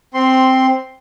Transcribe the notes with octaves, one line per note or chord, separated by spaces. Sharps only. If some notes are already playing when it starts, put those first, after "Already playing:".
C4 C6